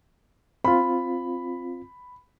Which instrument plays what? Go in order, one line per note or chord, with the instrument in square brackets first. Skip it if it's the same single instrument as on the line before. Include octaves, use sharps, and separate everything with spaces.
[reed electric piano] C4 F4 [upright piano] B5